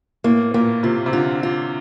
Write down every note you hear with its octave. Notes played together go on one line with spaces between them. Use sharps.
A2 A#3
A#2 A#3
C3 F4
C3
D3 F4
F4